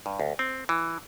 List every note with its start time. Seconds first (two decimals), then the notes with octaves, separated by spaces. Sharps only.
0.06 G2
0.20 D2
0.39 C4
0.69 E3